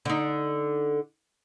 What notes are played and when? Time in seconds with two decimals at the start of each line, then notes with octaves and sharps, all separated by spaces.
0.05 D3 D#4